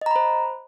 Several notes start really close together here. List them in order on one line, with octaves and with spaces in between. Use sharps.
D#5 A#5 B5 C5